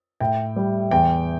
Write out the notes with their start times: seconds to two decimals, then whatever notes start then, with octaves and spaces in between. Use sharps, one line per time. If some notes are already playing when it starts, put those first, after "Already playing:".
0.20 A2 G5
0.56 G3
0.91 E2 G5